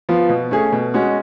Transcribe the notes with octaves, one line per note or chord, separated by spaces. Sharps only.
F3 B3 F4
B2
A3 C#4 G#4
B2
G#3 C#4 F#4